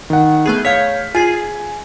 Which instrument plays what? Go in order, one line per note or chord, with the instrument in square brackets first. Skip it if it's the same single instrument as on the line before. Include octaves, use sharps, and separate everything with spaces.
[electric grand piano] D#3 F#5
[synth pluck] A3 B3 G#4
[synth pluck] C#5 G6 G#6 [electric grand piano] F5 B6
[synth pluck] F4 G#4 [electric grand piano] G#5